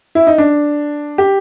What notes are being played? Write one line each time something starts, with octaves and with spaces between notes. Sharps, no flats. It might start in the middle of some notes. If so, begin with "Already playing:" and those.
E4
D#4
D4
G4